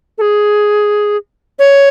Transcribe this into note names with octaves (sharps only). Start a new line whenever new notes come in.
A4
G#4
C#5